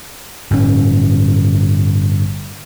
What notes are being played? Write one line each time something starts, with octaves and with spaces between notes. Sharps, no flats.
G1 A2 C#4